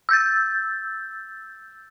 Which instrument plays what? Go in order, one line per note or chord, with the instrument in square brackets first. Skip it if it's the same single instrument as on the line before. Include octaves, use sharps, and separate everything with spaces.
[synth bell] E6 G6 A6